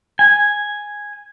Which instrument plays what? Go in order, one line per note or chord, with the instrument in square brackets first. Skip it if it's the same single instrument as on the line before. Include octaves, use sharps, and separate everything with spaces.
[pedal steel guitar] G#5